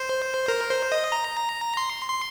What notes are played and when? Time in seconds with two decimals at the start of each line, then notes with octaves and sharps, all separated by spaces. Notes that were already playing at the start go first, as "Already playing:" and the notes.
Already playing: C5
0.48 A#4
0.70 C5
0.92 D#5
1.12 A#5
1.77 C6
2.09 C6